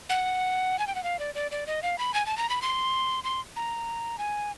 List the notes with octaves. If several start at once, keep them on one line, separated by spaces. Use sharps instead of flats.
F#5
G#5
G5
F#5
F5
D5
D5
D5
D#5
F5
B5
G#5
A5
A#5
B5
C6
C6
A#5
G#5